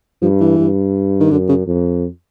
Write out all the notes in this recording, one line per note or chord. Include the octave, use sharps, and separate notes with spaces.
G2 F3
E3
G2
D#3
F#2 D3
C#3
F2